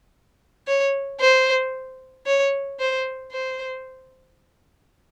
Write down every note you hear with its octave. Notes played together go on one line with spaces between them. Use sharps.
C#5
C5
C#5
C5
C5